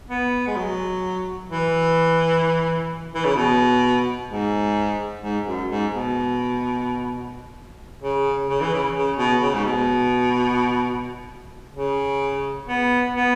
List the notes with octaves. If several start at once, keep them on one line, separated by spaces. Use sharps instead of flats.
B3
G#3
F#3
E3
E3
C#3
B2
G#2
G#2
F#2
G#2
B2
C#3
C#3
E3
C#3
C#3
B2
C#3
G#2
B2
C#3
B3
B3